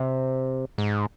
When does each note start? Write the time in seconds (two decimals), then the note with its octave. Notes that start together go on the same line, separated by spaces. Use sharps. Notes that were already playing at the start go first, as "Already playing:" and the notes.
Already playing: C3
0.78 G#2